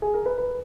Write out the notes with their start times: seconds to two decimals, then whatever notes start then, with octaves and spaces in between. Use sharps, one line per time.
0.02 G#4
0.14 A#4
0.26 B4
0.38 B4